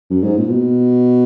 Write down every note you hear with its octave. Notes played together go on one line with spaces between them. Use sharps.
F#2
G#2
A#2
B2